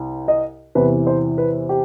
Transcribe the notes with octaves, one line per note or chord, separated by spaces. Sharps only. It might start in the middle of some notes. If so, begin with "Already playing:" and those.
Already playing: C2
D#5
E2 C3 E3 B4
C5
B4
G4